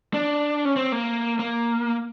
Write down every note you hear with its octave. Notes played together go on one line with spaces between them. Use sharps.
D4
C#4
C4
A#3
A#3